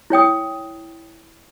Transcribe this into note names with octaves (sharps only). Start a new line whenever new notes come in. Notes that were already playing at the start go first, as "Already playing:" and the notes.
E4 C#5 G5 D#6